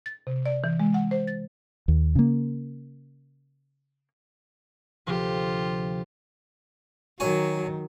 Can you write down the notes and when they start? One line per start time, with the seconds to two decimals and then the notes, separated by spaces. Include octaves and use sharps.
0.06 A6
0.27 C3
0.46 D5
0.64 E3
0.79 G#3
0.94 F#5
1.11 C5
1.27 A6
1.88 D#2
2.15 C#3 A#3
5.06 D2 C3 F3 F4 G4
7.20 D#3 F#3 C#5 G#5